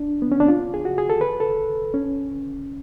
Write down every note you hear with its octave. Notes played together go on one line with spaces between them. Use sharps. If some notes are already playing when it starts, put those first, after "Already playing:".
Already playing: D4
B3
C#4
D4
F4
G#4
F#4
G#4
A4
B4
A4
C#4